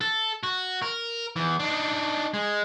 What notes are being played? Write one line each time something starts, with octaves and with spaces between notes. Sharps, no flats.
A4
F#4
A#4
E2 E3
D4 D#4
G#3